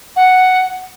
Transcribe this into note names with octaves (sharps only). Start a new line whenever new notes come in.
F#5